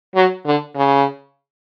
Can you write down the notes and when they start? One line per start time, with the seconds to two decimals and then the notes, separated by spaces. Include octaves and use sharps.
0.15 F#3
0.46 D3
0.76 C#3